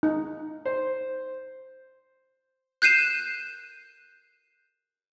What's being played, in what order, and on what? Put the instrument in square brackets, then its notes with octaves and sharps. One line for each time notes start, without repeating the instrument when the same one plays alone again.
[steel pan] D#4
[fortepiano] C5
[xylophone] F#6 G6 C7 D#7 E7